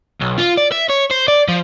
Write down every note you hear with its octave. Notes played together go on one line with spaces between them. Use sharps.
B1
F4
D5
E5
C#5
C5
D5
F3